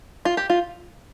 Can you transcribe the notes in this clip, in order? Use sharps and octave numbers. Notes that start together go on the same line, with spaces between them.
F4
G4
F4